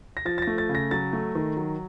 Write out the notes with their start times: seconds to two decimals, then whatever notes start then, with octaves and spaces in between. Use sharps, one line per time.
0.17 A#6
0.25 F3 A6
0.38 A6
0.42 A#6
0.47 A3
0.58 A6
0.69 C#3
0.75 A#6
0.91 F#3 A6
1.13 A3
1.35 D#3
1.57 F#3